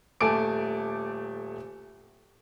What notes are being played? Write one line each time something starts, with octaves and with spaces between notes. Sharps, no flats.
D#1 A3 G#5 A5 D6 D7